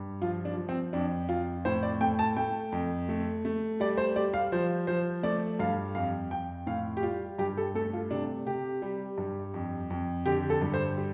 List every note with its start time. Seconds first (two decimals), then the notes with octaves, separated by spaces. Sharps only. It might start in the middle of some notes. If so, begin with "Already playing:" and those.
Already playing: G2
0.21 F3 F4
0.45 D4
0.57 F3
0.69 C4
0.93 F2 D4
1.29 F2 F4
1.65 A2 C5
1.83 D5
2.01 A3 G5
2.19 A5
2.37 A3 G5
2.72 F2
3.09 A3
3.45 A3
3.80 G3 D5
3.98 C5
4.16 G3 D5
4.34 F5
4.52 F3 C5
4.87 F3 C5
5.23 A3 D5
5.59 G2 F5
5.95 F2 F5
6.31 F2 G5
6.67 A2 F5
6.97 G4
7.03 G3 F4
7.38 G2 G4
7.57 A4
7.75 A3 A4
7.93 F4
8.11 C3 D4
8.46 C3 G4
8.82 G3
9.18 G2
9.54 F2
9.90 F2
10.26 D3 G4
10.50 A4
10.62 G2
10.74 C5
10.97 G3